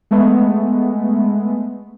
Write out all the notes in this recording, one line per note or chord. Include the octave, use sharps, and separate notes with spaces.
G#3 A3 B3